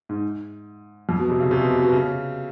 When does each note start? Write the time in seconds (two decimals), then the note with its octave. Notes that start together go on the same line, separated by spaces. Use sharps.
0.09 G#2
1.09 F2
1.19 B2
1.30 C3
1.40 C#3
1.51 C3
1.61 B2
1.82 B2
1.93 C#3